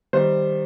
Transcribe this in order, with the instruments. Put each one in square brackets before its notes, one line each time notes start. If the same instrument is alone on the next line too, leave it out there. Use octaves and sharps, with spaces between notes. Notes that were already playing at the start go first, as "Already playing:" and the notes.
[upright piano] D#3 G3 C5